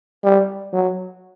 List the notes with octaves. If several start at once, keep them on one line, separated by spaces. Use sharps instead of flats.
G3
F#3